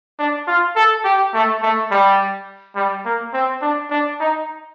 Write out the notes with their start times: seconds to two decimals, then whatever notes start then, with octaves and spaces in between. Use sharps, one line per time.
0.19 D4
0.47 F4
0.76 A4
1.05 G4
1.34 A3
1.62 A3
1.91 G3
2.76 G3
3.05 A#3
3.34 C4
3.62 D4
3.90 D4
4.20 D#4